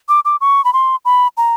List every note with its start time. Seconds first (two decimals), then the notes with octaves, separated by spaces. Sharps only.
0.09 D6
0.25 D6
0.41 C#6
0.65 B5
0.73 C6
1.05 B5
1.37 A#5